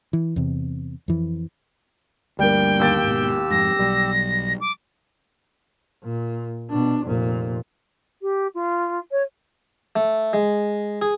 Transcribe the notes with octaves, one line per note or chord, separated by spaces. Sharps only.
E3
E2 C3
F2 E3
D2 G2 G3 A#3 G5
D#2 G4 E6 A6
G#2 B2
F2 G#2 A#6
B1 G3
D6
A#2
B2 D4
F1 A#2
G4
F4
C#5
A3
G#3
G#4